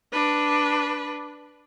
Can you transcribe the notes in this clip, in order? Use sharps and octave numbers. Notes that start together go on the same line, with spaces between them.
D4 B4